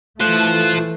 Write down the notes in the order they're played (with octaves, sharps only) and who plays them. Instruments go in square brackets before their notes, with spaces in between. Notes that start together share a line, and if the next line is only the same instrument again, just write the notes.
[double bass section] E3 A3 [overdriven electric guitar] F4 C5 [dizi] F#6